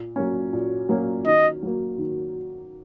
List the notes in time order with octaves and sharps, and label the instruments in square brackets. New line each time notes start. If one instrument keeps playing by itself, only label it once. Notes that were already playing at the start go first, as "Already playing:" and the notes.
Already playing: [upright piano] A#2
F#3 A#3 C#4
A#2
F#3 A#3 C#4
[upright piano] D#3 [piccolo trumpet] D#5
[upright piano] F#3 A#3
D#3